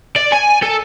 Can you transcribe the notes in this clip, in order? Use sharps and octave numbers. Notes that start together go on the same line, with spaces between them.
D5
G#5
A4